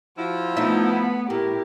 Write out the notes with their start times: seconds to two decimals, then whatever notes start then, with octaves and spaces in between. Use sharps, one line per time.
0.17 F3 E4 F#4
0.57 A3 B3 D#4 F4 E5
0.90 B5
1.30 A2 E4 G4 A#4